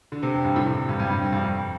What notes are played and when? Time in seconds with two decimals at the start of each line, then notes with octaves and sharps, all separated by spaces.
0.12 D3
0.23 C3
0.34 F2
0.44 G2
0.56 A2
0.66 C3
0.77 D3
0.89 G2
1.00 G2
1.10 G2
1.21 F2
1.32 G2
1.43 F2